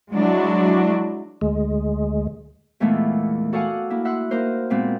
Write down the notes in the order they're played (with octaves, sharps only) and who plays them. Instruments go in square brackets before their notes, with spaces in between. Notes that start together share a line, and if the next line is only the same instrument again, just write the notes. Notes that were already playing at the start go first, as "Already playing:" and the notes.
[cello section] F#3 G#3 D4 E4 F#4
[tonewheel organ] D2 G#3
[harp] E2 A#2 E3 G#3 A3 B3
F#4 A4 D5 F5 F#5 G#5
A#3 E4
E5 F#5 C6 E6 F#6
A#3 D#4 A#4 C5
A#2 G#3 B3 C4